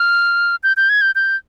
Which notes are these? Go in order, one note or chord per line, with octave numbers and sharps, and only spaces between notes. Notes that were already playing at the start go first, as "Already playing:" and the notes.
Already playing: F6
G6
G6
G#6
G6
G6